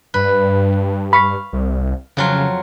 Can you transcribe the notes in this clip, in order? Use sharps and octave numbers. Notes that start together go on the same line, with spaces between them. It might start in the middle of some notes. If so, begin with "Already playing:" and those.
G2 B4
F5 B5 C#6 B6
C2
F2 C#3 F#3 F4